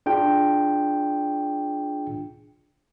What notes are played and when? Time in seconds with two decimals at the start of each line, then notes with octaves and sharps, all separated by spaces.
0.06 D4 F4 G#4 G5